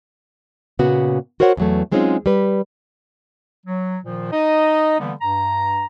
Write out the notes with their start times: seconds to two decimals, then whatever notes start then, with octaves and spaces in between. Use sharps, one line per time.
0.79 A#2 C#3 B3 F#4
1.40 F#4 A#4 C5 C#5 F#5
1.57 E2 F#3 A3
1.92 F#3 G#3 C4 C#4 D#4 F4
2.26 G3 B4
3.66 F#3
4.04 A#2 D#3 F3
4.32 D#4 D#5
5.00 D3 E3 G3 A#3 B3
5.22 G2 A#5